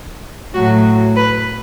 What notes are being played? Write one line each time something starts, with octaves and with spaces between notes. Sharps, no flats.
A2 F#3 F#4
B4